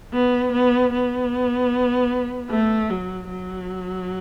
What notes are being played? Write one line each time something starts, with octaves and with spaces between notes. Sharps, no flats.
B3
B3
B3
A3
F#3
F#3